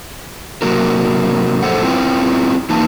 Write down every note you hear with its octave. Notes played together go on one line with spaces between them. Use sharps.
C3 F#3 A#3 F#4 A#4
F2 A2 A4 C5 F#5
C4 E4 F4 B4 G5
E3 A#3 D#4 A5